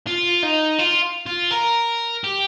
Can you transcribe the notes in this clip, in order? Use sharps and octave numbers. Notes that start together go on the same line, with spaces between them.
F4
D#4
F4
F4
A#4
G4